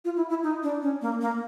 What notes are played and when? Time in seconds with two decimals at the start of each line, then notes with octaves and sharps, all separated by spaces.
0.05 F4
0.17 E4
0.29 E4
0.43 D#4
0.63 D4
0.82 C#4
1.01 A#3
1.21 A#3